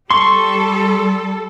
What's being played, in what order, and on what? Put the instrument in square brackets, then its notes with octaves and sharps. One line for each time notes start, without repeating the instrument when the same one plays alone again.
[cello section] G3 A4 [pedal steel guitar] C6 C#6